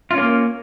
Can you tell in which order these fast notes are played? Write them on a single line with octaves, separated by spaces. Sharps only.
F4 C#4 A#3